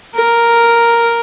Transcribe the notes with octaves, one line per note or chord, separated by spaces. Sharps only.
A#4